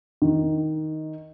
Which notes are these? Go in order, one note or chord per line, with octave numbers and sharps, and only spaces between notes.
D#3